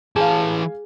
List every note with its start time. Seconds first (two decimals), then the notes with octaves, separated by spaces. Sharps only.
0.16 E3 G#4 F5 G#5 A5